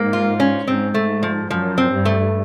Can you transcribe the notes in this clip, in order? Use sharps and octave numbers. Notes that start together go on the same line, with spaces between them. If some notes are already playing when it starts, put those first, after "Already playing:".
Already playing: G#2 A#3
F4
C#4
G#2 C4
A3
F3
F#2 F3
C4
G2
A3